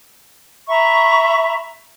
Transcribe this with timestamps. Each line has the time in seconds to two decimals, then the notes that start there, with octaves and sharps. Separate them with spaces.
0.68 E5 A#5 B5 C#6